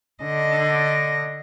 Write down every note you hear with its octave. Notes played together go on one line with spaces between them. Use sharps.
D3 D#5